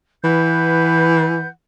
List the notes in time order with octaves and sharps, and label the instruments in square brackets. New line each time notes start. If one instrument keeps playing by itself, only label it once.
[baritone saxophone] E3 [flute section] B4 F#5 G6